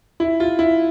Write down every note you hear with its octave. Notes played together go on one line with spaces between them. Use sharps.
E4
F4
E4